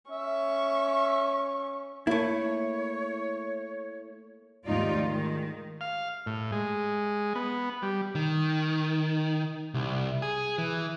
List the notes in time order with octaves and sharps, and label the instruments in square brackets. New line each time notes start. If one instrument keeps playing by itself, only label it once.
[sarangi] C#4 [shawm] E5 [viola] C#6
[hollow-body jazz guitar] A3 E4 [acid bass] A#3 [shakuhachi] C#5
[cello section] D#2 G#2 A3 D#4 F4 D5
D#3 G#3
[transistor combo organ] F5
A2
G#3
B3
G3
[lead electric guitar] D#3
C2
G#4
E3